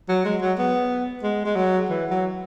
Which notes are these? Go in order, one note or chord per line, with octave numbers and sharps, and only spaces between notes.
F#3
G#3
F#3
B3
G#3
G#3
F#3
E3
F#3